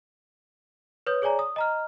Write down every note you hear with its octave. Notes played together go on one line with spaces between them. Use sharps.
B4 C#5 D#6 G6
G#4 C#5 D5 G#5 A#5
D#6
D#5 A#5 F6